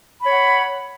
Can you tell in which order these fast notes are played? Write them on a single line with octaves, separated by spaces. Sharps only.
B5 C#5 F#5